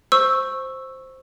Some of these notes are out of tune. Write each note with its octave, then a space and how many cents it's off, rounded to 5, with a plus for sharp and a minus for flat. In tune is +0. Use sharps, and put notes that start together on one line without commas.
C5 +0 C#6 -10 E6 +0